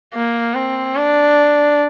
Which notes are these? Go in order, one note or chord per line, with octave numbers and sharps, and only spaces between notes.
A#3
C4
D4